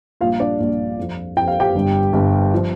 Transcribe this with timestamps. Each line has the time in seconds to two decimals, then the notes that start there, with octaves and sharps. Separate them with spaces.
0.21 A#1 A#2 G3 F4 F5
0.40 D4 D5
0.59 A#1 A#2 G3
0.97 F2 F3
1.36 F2 F3 G5
1.48 F5
1.60 G4 G5
1.75 G1 G2 G3
2.13 G1 G2 G3
2.54 F3